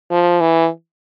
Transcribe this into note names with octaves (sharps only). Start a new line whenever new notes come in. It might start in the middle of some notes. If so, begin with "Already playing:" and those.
F3
E3